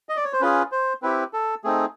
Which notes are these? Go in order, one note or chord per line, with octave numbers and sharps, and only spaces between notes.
D#5
D5
C#5
C5
C#4 F4 G#4 B4
C5
C4 E4 G4 B4
A4
A3 C4 D#4 G#4